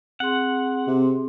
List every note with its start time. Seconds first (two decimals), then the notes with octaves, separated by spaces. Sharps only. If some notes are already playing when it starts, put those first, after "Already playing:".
0.20 C4 G#4 F#5 C6
0.87 C3